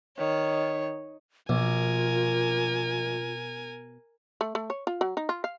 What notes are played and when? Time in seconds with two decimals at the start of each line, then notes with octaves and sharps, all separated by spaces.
0.18 D#3 C#5
1.49 A#1 B2 F4 A#4 G#5
4.41 A3
4.55 A3
4.70 C#5
4.87 F4
5.01 F#3
5.17 D#4
5.29 F4
5.44 F5